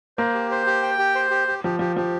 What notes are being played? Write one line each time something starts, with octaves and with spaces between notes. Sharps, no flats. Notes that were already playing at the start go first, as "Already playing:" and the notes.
A#3 C5
G4
C5
G4
G5
G4
C5
G4
G4
F3 G4
F3 G4
F3 G4